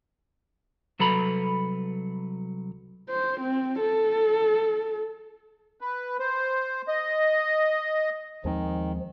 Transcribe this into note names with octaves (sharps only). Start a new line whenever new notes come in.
C2 F#3 A4 B4 A#5 B5
C5
C4
A4
B4
C5
D#5
D#2 D#3 F3 G#3 C4